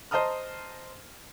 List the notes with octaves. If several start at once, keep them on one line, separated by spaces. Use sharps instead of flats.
C5 D#5 A5 A#5 D#6 F6